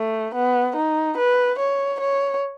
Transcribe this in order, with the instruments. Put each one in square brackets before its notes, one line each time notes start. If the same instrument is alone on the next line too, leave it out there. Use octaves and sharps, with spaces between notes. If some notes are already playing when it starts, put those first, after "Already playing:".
Already playing: [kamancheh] A3
B3
D#4
B4
C#5
C#5